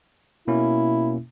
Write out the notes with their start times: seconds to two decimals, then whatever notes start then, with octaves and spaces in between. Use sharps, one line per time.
0.48 B2 A#3 C#4 E4